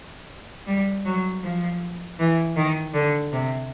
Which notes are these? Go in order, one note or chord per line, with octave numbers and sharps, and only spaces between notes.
G3
F#3
F3
E3
D#3
D3
C3